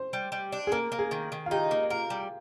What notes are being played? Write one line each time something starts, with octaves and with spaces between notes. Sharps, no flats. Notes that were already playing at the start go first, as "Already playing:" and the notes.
Already playing: C5
G3
G3
D4
G#4
A#3 A#4
A#3
G#4
D#3
D#3
F4
D#4 G4
A#3
F4 A#4
G3